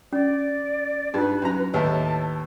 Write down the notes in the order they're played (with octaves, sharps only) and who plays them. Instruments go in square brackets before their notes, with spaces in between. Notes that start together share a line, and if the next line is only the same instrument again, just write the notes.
[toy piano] C#4 [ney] D5
[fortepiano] G2 [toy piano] D#4 F4 [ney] B4
[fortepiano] F#2 A#5
[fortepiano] D#2 A2 [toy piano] B4 [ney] A5